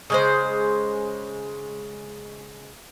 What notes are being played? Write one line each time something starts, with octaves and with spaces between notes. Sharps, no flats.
C#3 G#3 C5